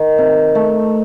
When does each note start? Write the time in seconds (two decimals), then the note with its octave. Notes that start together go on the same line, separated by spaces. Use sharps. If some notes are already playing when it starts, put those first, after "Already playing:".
Already playing: D#3
0.18 C3
0.55 A3